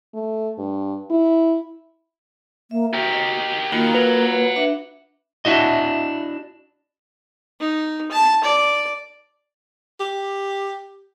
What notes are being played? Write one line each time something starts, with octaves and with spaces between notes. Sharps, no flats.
A3
G2
E4
A#3 E5
F#4 G4 A#4
D#5
D#3 A#3 F4 F#4 B5
B4 F#5 A#5
D4 E5
D4 E4 F#4 D#5
D#4
A5
D5
G4